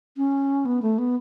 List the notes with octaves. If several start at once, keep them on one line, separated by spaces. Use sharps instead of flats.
C#4
B3
A3
B3